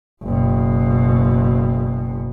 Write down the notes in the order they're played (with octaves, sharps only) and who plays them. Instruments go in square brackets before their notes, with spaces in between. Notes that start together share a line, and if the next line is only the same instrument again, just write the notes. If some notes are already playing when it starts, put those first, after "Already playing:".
[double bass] F#1 B2